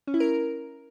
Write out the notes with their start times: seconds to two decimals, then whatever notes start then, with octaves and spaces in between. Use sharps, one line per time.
0.07 C#4
0.14 E4
0.20 A#4